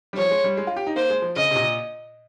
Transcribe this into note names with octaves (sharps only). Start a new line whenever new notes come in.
G3
F3 C#5
G#3
G3
G#3
F4
G4
D#4
A#3 C5
G#3
F3
C#3 D#5
C3
A#2